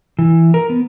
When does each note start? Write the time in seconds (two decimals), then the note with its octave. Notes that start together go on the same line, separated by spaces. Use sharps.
0.19 E3
0.54 A#4
0.70 B3